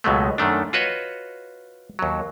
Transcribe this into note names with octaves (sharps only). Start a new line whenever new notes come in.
C#2 B2 F#3 G#3 A3
F#2 D#3 A3 D4
F4 F#4 B4 C#5 D#5
D#2 F#3